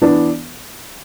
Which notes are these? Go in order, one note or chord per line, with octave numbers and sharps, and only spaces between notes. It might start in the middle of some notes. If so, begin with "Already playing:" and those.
E3 B3 D4